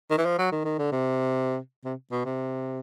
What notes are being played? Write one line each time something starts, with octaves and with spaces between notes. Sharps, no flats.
D#3
E3
F3
F#3
D#3
D#3
D3
C3
C3
B2
C3